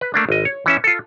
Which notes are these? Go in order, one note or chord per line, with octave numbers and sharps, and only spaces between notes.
B4
A3 A#3 D4
G#1 D#5
C#5
E3 C#4 E5
F4 A4